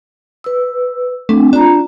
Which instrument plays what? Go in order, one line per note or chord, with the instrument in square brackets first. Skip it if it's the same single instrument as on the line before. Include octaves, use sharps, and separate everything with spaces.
[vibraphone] B4 E6
[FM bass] A3 [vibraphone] C4 D4
[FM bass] D4 [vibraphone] F4 A#5